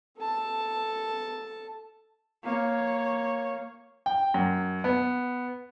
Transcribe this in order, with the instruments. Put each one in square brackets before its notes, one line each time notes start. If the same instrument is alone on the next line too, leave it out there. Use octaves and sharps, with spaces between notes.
[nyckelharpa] A4 A5
[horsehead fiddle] A#3 C#5
[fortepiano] G5
F#2
B3